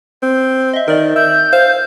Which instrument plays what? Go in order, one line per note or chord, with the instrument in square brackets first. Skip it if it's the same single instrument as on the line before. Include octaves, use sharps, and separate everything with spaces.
[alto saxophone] C4
[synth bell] D#5 E5
[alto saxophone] D#3 [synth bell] A#4 D5 D#5
[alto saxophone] E5 [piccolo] G6
[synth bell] C5 [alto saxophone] F5